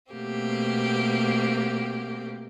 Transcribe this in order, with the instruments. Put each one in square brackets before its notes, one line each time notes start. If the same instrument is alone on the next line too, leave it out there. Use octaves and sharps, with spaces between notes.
[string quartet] B2 A3 A#3 C4 G4